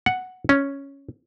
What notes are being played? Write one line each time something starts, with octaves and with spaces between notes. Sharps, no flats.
F#5
C#4